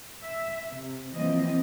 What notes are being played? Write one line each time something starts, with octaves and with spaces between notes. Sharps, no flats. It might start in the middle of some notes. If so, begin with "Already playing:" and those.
E5
C3
E3 F3 A#3 C4 D#5